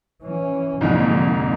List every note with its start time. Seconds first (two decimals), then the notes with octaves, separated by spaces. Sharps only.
0.23 E3 C#4
0.81 C2 F2 G#2 D3 A#3